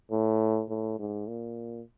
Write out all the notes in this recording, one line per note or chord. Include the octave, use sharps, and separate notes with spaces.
A2
A2
G#2
A#2